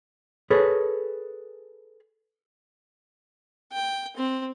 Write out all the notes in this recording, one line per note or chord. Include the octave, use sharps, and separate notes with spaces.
G#4 A4 B4 C#5
G5
C4